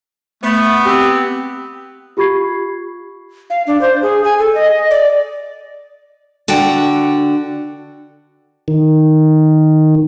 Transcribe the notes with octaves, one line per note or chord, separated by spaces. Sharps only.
A3 B3
C4 G4
F4 G4 B5 C#6 G#6 C7
F5
D4
C5
G#4
G#5
A4
D#5
D5
D3 F#4 D5 G5 A5
D#3